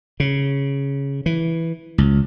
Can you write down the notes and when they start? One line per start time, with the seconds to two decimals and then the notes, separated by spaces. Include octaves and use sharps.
0.20 C#3
1.26 E3
1.98 C#2